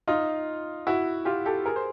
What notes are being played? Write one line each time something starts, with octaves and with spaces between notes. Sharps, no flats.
D#4 F4
E4 F#4
F4 G4
G4 A4
G#4 A#4
C5